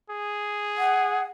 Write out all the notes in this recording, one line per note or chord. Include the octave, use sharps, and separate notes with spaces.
G#4
F#5